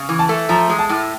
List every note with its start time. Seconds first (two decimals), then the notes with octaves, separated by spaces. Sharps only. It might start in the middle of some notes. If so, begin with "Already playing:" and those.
Already playing: C#3
0.09 E3
0.19 A5
0.29 A3
0.49 F3 A#5
0.70 G#3
0.79 A5
0.89 A2